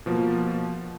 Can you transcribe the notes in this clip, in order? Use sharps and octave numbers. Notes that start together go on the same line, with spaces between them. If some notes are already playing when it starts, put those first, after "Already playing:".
B2 F3 A#3